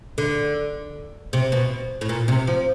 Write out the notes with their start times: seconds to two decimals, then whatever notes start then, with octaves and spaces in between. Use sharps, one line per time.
0.18 D3
1.33 C3
1.52 B2
2.01 A2
2.09 A#2
2.28 C3
2.47 F3